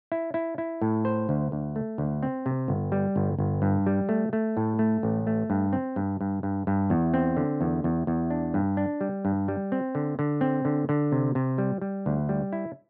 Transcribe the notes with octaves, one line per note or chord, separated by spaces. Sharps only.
E4
E4
E4
A2
C5
D2
D2
A3
D2
C4
C3
G1
G3
G1
G1
G2
G3
A3
A3
A2
A3
A1
A3
G2
C4
G2
G2
G2
G2
E2
C4
D3
E2
E2
E2
D4
G2
D4
G3
G2
G3
C4
D3
D3
C4
D3
D3
C3
C3
G3
G3
D2
G3
E4